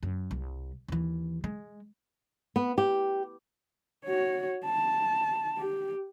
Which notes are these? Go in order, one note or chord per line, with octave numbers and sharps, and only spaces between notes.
F#2
C2
D#2 E3
G#3
B3
G4
F#4 C#5
A5
G4